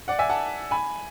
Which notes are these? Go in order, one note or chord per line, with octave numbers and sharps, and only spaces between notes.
D5 F#5
E5 G#5
F#5 A5
G#5 B5